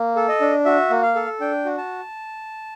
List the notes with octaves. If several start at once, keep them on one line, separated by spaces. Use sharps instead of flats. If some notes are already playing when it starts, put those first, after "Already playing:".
Already playing: A#3
A4
D#5
D4
F#4 E5
A#3
F5
A4
D4 G5
F#4
A5